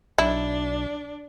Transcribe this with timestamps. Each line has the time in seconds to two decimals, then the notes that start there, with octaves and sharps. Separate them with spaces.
0.18 B1 D4 E4